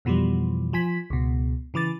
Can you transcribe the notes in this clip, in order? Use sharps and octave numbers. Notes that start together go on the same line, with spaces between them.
F2 B2 E3 F3 G3
F3 G#5 B6
C#2 B2
C#3 E3 D6 A6